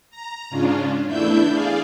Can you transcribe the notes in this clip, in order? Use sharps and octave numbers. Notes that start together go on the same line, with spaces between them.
A#5
G#2 C#3 C#4 D4 F4
E2 A3 D4 E4 E5 G6
G#4 D5 F5